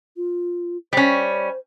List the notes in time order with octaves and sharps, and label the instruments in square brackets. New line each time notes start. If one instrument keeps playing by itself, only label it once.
[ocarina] F4
[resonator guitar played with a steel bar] G3 C#4 [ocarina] C5